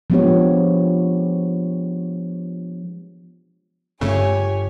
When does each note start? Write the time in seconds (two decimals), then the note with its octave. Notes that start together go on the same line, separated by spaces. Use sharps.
0.10 F3 G#3 B3 D4 G4 C#5
4.01 G1 G2 C#3 A3 G4 C#5 G#5